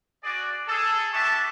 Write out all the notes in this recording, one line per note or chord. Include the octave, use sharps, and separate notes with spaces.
F#4 G#4 D5
G#4 A4
D4 G4 E5 A5 C#6